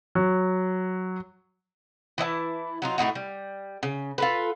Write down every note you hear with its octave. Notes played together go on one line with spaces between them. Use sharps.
F#3
E3 E4 D#5 A5
F#3 D#4 F4
A2 C3 D#4 F#4
G3
C#3
F4 A4 B4